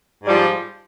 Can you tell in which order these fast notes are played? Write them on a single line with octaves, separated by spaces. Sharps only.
G#2 G3 F3